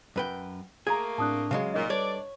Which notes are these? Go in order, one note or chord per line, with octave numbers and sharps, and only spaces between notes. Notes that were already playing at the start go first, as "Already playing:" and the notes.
F#2 B4 G5
A3 A#3 G#4 A#5 G#6
A2 C4 D4 A5 D#6 F#6
C#3 F#3 G#3 F5
A#2 D#4 D#5
G3 D4 A4 B4 C#5 D5